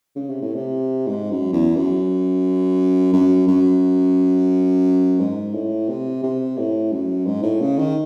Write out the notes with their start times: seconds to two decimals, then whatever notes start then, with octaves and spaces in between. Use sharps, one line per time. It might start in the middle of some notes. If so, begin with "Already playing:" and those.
0.16 C#3
0.30 C3
0.42 A2
0.55 C3
1.07 G#2
1.31 F#2
1.53 E2
1.76 F#2
3.13 F#2
3.48 F#2
5.19 G#2
5.55 A2
5.89 C3
6.23 C3
6.58 A2
6.92 F#2
7.26 G#2
7.43 A2
7.61 C#3
7.78 D#3